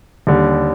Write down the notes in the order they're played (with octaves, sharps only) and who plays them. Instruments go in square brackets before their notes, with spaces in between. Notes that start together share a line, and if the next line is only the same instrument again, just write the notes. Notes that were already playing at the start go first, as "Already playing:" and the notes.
[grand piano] D#2 D3 G3